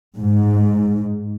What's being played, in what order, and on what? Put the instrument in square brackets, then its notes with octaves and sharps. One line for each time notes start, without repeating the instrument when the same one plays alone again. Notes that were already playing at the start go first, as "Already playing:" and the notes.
[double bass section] G#2